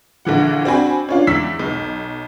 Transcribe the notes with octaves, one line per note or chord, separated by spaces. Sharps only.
A#1 D3 E3 F#5
C4 D4 F#4 G#5 B5
C#4 D4 F4
E2 E4 E6 B6
B1